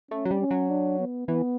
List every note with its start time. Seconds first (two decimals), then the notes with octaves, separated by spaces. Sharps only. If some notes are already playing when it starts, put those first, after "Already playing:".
0.11 A3 C#4
0.25 F#3
0.31 G3
0.41 C#4
0.51 F#3
0.69 D4
0.99 B3
1.27 E3 B3